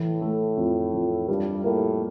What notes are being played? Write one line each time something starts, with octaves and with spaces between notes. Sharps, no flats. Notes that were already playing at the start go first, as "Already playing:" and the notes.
Already playing: A2 E3
A3
F2
F2
G2 G3
A2 A#3